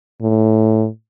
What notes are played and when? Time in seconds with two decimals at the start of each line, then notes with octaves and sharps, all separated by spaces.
0.22 A2